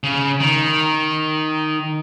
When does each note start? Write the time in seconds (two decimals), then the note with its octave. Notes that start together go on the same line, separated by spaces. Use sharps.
0.03 C#3
0.40 D#3